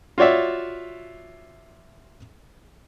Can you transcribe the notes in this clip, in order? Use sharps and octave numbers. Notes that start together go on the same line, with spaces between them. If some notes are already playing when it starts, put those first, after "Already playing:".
F4 F#4 C#5 D5 E5